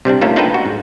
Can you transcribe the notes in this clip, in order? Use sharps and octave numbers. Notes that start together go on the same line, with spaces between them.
C3 G3 C4 D4
A3 A#3 C#4 D#4 F4 A4
D4 D#4 F4 A4 B4 G5
F#4
G#2